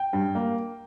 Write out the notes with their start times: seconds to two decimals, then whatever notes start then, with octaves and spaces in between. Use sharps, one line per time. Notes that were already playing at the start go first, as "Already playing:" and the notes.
Already playing: G5
0.13 G2
0.35 A#3